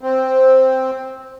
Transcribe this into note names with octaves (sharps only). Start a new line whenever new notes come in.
C4